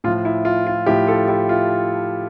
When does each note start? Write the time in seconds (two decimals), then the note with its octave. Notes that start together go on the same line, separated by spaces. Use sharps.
0.04 A2 F4
0.08 F3
0.25 E4
0.45 F4
0.67 F4
0.86 A2 F3 E4 G4
1.07 F4 A4
1.28 E4 G4
1.49 F4